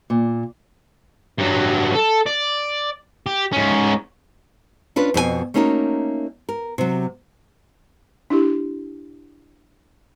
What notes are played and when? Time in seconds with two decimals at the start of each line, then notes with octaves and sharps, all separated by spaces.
0.10 A#2
1.39 G2 F#3
1.95 A4
2.27 D5
3.26 G4
3.52 G#2 C#4
4.96 C#4 D4 F4 B4
5.14 F2 B2 A4 G#5
5.54 A3 A#3 C#4 D#4 F#4 A#4
6.49 A#4
6.78 C3 F#3
8.30 D4 E4 G4